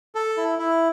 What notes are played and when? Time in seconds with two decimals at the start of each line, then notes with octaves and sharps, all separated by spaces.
0.15 A4
0.37 E4
0.59 E4